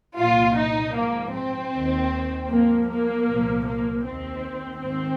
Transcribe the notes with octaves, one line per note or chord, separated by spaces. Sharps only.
C2 A#2 F3 F4
D#4
G#2 F3 A#3
C4
D#2 D#3
G#2 F3 A#3
A#3
C2 A#2 F3
A#3
D#2 D#3 C4
G#2 D#3 C4